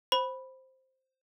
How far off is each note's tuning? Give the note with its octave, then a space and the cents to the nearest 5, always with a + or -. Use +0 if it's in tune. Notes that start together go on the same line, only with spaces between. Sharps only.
C5 +0 B5 +0